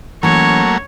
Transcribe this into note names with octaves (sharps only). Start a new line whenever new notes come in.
E3 F#3 A3 A#3 C#4 C#5